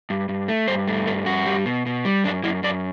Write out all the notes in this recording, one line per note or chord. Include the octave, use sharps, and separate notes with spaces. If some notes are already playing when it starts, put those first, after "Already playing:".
G2
G2
A3
G2 C5
A3
G2 A4
G2 F#4
G3
B2
B2
G3
F#2 D4
F#2 E4
F#2 D5